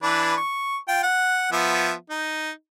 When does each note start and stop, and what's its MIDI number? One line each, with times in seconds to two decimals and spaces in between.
0.03 0.35 52
0.03 0.35 62
0.03 0.35 71
0.37 0.76 85
0.88 1.02 65
0.88 1.02 79
1.03 1.52 78
1.52 1.92 53
1.52 1.92 59
1.52 1.92 76
2.10 2.50 63